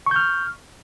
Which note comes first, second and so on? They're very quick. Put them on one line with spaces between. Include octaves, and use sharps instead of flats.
C#6 G6 F6